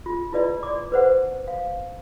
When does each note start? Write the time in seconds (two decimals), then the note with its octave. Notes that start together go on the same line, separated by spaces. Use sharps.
0.06 F4
0.32 E4 F4 B4 D5 D#5
0.63 D5 D6
0.92 B4 C5 F#5
1.48 F5